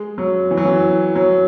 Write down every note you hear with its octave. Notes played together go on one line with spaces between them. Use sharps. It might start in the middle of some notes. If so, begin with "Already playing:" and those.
Already playing: G#3
F#3
E3
F#3
E3
F#3